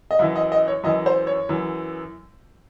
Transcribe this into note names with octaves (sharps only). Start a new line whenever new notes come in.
D#5
F#2 E3 E5
D#5
D#5
C#5
F#2 E3 D#5
C5
C#5
F#2 E3